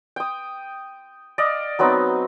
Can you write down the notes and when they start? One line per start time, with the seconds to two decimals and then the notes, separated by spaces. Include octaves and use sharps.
0.16 G5 D#6
1.38 D5 D#5 F5
1.79 F#3 B3 C4 D#4